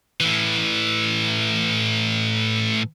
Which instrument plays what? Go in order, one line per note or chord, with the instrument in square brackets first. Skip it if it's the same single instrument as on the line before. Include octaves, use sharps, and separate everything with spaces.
[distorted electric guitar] A2 E3